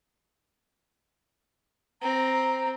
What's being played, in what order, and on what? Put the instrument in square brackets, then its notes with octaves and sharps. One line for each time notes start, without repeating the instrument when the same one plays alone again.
[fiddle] C4 [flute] A#5